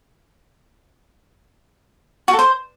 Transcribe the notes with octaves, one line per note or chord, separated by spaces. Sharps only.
F#4
A4
C5